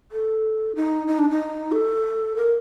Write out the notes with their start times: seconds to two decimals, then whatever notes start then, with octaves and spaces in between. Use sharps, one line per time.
0.12 A4
0.75 D#4
1.07 D#4
1.19 D4
1.30 D#4
1.72 A4
2.36 A#4